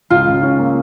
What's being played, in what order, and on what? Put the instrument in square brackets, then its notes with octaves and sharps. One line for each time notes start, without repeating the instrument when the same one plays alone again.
[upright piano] C#2 [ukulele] F4
[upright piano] C#3
C#4
A#3